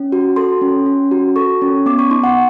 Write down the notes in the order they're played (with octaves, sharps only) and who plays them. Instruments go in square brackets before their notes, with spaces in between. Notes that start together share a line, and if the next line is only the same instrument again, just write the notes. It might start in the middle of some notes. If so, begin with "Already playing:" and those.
Already playing: [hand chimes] C#4
F#4
A4 C6
C#4
C#4
F#4
A4 C#6
C#4
B3 D6
C#6
D#4 C6
F#5